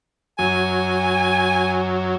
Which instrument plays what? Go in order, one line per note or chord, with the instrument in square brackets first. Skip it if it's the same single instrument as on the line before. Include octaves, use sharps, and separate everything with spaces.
[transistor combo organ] F#2 F#3 [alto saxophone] G#5